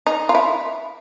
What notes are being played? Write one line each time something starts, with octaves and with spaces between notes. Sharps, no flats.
D#4
F4
E4